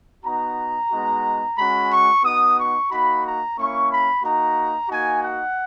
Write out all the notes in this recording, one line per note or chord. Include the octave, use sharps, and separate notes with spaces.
B3 D#4 F#4 A#5
G#3 B3 D#4 F#4
G#3 C#4 F#4 B5
C#6
B3 D#4 F#4 D#6
C#6
A#3 D#4 F#4 B5
A#5
A#3 C#4 E4 C#6
B5
A#3 D#4 F#4 A#5
A#3 D#4 F#4 G#5
F#5